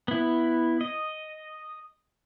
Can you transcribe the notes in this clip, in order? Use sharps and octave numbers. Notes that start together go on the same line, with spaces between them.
B3 E4
D#5